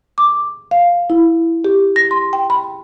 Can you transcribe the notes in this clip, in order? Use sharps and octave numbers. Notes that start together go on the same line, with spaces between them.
D6
F5
E4
G4
A#6
C6
G5
B5